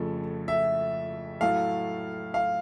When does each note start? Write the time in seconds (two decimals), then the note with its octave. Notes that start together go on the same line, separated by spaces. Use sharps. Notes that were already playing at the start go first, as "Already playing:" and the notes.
Already playing: F2 C#3 F3 A3
0.48 E5
1.41 A2 F#3 A3 F5
2.34 F5